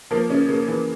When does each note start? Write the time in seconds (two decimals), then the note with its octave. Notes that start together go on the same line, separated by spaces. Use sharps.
0.11 F3 A#3
0.29 C#3 C#4
0.48 C#3 A#3
0.68 E3